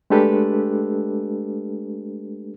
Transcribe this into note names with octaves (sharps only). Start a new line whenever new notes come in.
G#3 A3 D4 G4 A4 B4